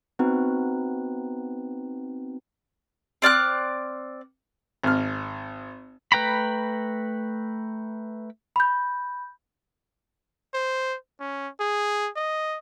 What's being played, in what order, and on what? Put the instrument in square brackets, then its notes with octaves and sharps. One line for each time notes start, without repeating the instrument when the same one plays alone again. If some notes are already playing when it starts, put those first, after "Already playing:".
[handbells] B3 C4 D#4 F#4 B4
[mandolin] C4 D5 F6 F#6
[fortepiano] G#1 F6
[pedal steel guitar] A3 B4 G5 A#5 B5
[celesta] B5 G6
[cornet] C5
C#4
G#4
D#5